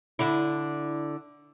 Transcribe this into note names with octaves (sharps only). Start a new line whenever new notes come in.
D3 D4 E4